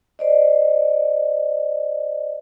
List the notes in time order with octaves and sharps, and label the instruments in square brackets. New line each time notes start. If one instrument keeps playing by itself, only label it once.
[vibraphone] C5 D5 D#5